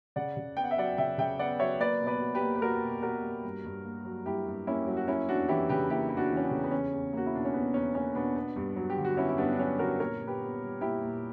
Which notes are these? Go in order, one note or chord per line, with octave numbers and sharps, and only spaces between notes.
C#3 D5 F#5
C#3
B3 G5
F#5
E5
F#3 D5 F#5
C#3 E5 G5
C#3 E5 G5
B3 D5 F#5
F#3 C#5 E5
A#3 B4 D5
B2
B4 D5
B2
G4 B4
A#3
B4
A#3 F#4 A#4
B2
B2 F#4 A#4
A#3
G2
G2
A#3
F#3
G2 E4 G4
G2
A#3 C#4 E4
F#3
F#4
A#3 C#4 E4
E2 D4 F#4
E3 E4 G4
C#3 G4 B4
A#3 E4 G4
E2 E4
D4 F#4
E3
C#4
B3 D4
C#3
B3
E2 C#4
E2
A#3 F#4
E4
B2 D4
C#4
E2 B3
E2 C#4
A#3 C#4
B2 B3 D4
B3
G2
F#3
G4
D3
F#4
B3 C#4 E4
E4
G2 B3 D4
D4
F#3 C#4
D3 F#4 A#4
A#2 A#4 C#5
A#2
G4 B4
B3
G3
A#2 E4 G4
A#2